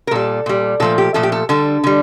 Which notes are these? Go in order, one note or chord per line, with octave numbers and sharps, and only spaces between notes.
A#4
A#2 G3 A4
A#2 G3
A#2 F3 A3 A4
G4
A#2 F3 A3 A4
G4
A4
D3 G3 A4
D3 G3